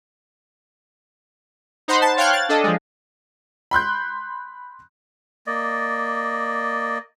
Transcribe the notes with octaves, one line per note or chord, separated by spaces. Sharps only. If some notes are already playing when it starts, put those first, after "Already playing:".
D#4 C5 F#5 B5 C6
A5
C#5 F5 G5 F6 F#6 G#6
A6
D4 A4 D#5
F3 G#3
B5 C6 F#6 G6
A#3 D5 D#5